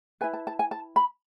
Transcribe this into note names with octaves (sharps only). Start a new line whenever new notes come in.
E4 B4 G#5
A5
A5
G#5
A5
B5